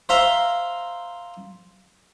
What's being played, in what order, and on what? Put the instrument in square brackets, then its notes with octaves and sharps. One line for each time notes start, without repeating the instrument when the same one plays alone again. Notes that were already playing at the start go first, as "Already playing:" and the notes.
[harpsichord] C5 E5 F5 A#5 C6